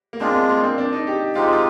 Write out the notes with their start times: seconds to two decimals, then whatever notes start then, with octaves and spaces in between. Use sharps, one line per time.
0.13 A#3
0.20 G#3 C4 D4 F4
0.49 A#3
0.63 C4
0.78 D4
0.92 D#4
1.07 G4
1.35 G#3 C4 D#4 F4 G4
1.53 F4